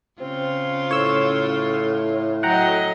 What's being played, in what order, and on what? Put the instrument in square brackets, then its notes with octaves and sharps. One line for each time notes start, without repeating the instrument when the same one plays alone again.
[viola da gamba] C#3 F4 [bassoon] C4
[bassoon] A2 [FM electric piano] C#5 E6
[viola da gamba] F#3 D#5 [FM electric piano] F#5 G5 A#5